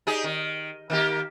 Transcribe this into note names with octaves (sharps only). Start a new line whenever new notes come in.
D#4 G4 G#4
D#3
D#3 A#3 G4